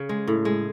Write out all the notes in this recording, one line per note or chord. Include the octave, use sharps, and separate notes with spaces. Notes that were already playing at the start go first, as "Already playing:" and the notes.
Already playing: C#3
G#3
A2
G#3